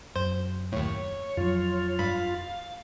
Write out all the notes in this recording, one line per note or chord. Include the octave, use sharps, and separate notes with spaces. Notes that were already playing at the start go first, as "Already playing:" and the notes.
F#2 C5
D#2 A2 C#5
F2 F#3 F4
G2 F5 B5